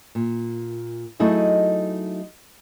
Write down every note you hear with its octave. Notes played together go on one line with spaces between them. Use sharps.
A#2
F#3 A3 D#4 E4 G#4 D#5